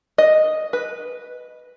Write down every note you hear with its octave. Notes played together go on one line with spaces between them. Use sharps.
D#5
B4